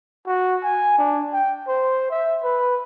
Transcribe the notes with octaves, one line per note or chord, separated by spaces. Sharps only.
F#4
G#5
D4
G5
C5
E5
B4